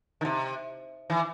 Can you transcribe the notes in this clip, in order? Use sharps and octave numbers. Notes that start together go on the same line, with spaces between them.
D#3
C3
E3